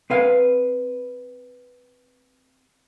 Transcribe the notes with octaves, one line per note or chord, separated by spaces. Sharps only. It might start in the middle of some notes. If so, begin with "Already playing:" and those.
C4 B4 F5